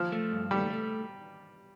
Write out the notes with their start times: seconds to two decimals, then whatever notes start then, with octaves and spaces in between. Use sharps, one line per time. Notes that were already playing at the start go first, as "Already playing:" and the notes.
Already playing: F3
0.12 A3
0.32 G2
0.51 G3 A3
0.70 A3